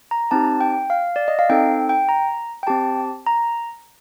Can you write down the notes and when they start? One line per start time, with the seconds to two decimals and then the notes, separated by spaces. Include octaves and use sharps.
0.11 A#5
0.31 C4 D#4 G4 A5
0.61 G5
0.90 F5
1.16 D5
1.28 D#5
1.39 F5
1.49 C4 D#4 A4 G5
1.89 G5
2.09 A#5
2.63 G5
2.67 C4 G4 A5
3.27 A#5